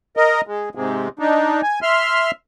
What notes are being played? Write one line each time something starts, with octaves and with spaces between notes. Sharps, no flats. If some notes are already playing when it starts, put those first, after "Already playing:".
A#4 D#5
G#3
G#2 C3 G#3
D4 D#4
G#5
E5 C6 F6